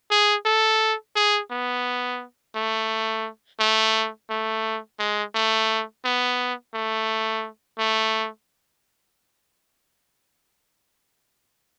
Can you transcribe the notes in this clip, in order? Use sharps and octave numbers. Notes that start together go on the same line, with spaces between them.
G#4
A4
G#4
B3
A3
A3
A3
G#3
A3
B3
A3
A3